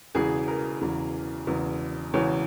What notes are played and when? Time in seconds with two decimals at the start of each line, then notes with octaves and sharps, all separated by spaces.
0.15 E1 E2 C#3 E3 G#4
0.48 A#4
0.81 E1 E2 C#3 E3
1.47 E1 E2 C#3 E3
2.13 E1 E2 C#3 E3 C#5